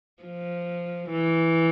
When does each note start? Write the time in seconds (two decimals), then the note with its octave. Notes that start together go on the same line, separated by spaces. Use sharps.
0.23 F3
1.10 E3